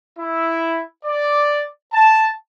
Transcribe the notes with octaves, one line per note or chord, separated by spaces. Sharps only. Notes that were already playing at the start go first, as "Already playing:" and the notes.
E4
D5
A5